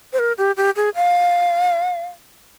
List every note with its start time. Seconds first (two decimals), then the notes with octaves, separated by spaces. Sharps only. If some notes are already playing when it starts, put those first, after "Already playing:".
0.13 C5
0.19 A#4
0.38 G4
0.57 G4
0.76 G#4
0.95 F5